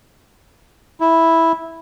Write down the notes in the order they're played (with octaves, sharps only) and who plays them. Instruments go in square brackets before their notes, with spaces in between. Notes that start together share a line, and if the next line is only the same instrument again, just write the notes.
[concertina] E4